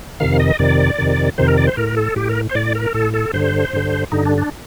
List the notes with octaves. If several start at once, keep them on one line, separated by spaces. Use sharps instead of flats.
F2 C3 D#3 F5
D#5
F2 C3 D#3 D5
F2 C3 D#3
F2 C3 D#3 C5
A#4
D5
C5
A2 A#4
A4
A2 G4
A#4
C5
A2 D5
A#4
A2 A4
A4
G2 D3 C5
G2 D3
G2 D3 D#4
D4
D4